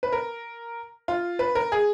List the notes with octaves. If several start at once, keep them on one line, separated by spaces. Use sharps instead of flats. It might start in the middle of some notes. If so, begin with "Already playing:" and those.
B4
A#4
F4
B4
A#4
G#4